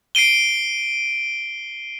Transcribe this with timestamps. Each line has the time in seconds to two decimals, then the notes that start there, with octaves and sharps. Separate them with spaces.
0.15 C7 D7 D#7 G7